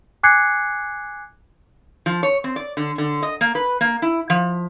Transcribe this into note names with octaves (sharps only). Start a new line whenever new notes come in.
G#5 D6 F#6 G#6 C7 C#7
F3
C#5
C4
D5
D3
D3
D#5
A#3
B4
A#3
E4
F3